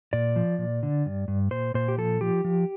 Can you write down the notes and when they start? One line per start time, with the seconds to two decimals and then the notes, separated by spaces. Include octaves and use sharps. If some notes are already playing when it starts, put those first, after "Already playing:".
0.13 A#2 D5
0.36 F3
0.58 A#2
0.83 D3
1.06 G2
1.28 G2
1.51 A#2 C5
1.74 A#2 C5
1.88 G4
1.98 F3 A4
2.21 F3 G4
2.44 F3